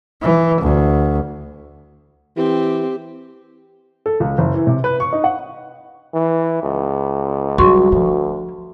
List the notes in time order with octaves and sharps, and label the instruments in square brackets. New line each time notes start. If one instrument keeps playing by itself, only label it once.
[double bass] E3
D2
[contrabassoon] E3 [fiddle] C4 [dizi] G4
[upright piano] A4
C#2
F#1
E3
C3
B4
C#6
D#4
F#5
[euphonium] E3
C#2
[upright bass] F#3 G3 [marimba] F#4 C6 C#6
[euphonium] D2 [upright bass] F3